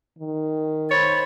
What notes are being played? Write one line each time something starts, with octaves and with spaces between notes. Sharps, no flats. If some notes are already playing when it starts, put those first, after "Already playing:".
D#3
C5 C#5 B5 A6